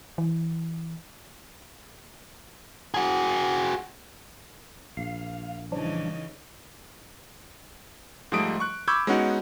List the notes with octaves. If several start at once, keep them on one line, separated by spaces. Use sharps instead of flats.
E3
F#4 G#4
A#1 F5
C#3 E3 F3 G3 D4 D#4
G#2 F3 G3 A3 D#6 D7
C#6 F#6
B5 C#6 D6 E6 G6 G#6
G#3 B3 C#4 D#4 F#4 F#5